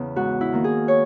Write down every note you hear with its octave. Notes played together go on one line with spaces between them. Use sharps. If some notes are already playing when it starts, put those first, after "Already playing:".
Already playing: E2 C#3 B3
G#2 F#4
E4
D#3 A#3
G#4
C#5